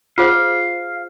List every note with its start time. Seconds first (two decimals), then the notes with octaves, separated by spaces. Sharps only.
0.18 F4 G#4 C5 F5